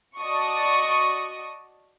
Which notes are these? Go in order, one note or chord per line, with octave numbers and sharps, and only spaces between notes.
F#4 D5 D#5 A5 C#6 D#6